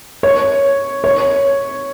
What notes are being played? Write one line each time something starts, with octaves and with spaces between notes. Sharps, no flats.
C#5
C#5